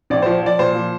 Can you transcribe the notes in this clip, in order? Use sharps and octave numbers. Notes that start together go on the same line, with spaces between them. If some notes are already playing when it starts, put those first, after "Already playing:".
A#1 D5
F3 C5
F3 D5
A#2 C5
F3